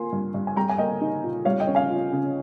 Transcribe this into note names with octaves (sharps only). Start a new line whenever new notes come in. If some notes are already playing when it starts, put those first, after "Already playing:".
Already playing: F3 A#3 G#5 C6
G2
G2
G#5
G3 G5 A#5
G#5
A#3 D#5 G5
D#4
A#2
G3 C#5 F5
D#5 G5
C#4
F5 G#5
F4
C#3